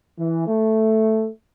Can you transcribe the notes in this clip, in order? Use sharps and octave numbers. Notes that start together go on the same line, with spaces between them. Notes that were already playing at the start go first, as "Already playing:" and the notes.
E3
A3